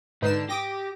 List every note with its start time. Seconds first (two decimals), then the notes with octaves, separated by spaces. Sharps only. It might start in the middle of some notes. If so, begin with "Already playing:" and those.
0.22 G#2 D3 D#4 B4 G6 C7 E7
0.49 G4 D6 D#6 A#6